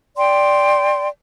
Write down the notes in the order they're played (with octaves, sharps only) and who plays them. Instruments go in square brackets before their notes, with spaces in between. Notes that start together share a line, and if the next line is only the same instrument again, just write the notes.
[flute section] D5 G5 C6